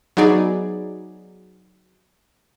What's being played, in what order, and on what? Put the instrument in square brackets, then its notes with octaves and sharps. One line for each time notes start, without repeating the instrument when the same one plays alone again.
[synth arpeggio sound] F#3 B3 D#4 G#4 D5